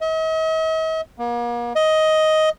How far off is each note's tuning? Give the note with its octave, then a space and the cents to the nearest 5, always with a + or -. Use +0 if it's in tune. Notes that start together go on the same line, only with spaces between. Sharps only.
D#5 +45
A#3 +40
D#5 +10